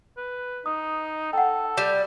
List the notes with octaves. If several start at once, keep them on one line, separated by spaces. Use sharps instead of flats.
B4
D#4 D#6
A4 F#5 G5
G3 G6 E7